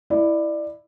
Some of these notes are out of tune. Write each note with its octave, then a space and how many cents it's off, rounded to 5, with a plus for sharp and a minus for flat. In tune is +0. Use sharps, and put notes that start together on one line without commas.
E4 +0 D5 +20